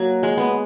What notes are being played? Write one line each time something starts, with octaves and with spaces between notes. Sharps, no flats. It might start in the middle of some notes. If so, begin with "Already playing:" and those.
Already playing: F#3 A#3
G#3
B3